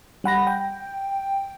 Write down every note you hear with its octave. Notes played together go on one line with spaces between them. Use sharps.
G3 F#5 B5 A#6
G5